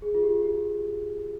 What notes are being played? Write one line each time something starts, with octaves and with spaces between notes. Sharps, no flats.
G#4
F4
G4
G4